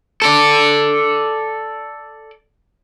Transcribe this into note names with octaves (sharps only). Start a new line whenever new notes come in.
A4 D5